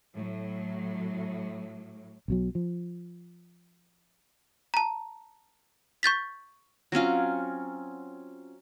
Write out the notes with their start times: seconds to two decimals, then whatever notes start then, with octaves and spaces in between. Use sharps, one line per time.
0.16 A2 F#3
2.28 B1 B2 F#3
2.55 F3
4.74 A5 A#5
6.03 C#6 G6 A6 B6
6.92 F#3 C4 C#4 F4